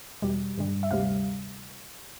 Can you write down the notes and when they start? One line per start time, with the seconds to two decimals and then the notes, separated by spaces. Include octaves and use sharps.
0.22 E2 B2 G3
0.57 G2 D3 G3
0.83 E5
0.91 D2 C3 G3 F5